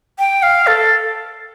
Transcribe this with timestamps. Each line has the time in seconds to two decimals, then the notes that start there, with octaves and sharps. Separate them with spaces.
0.19 G5
0.43 F5
0.67 A4